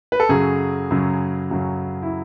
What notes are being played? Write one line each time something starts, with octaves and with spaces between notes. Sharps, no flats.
B4
A4
F#2 C#3 F#3 G#4
F#2 C#3 F#3
F#2 C#3 F#3
E4